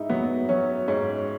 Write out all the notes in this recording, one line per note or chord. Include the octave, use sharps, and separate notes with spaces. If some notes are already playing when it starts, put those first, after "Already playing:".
Already playing: G#2 D#4 E4
F#3 B3
F#3 C#4
G#2 C#4